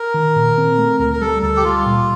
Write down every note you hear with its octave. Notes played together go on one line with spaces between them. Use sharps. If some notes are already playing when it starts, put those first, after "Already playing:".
Already playing: A#4
D#3
A#2
C4
A3
D2 A#4
A#4
G3 A4
D2 A4
G4
G3 F4
A#2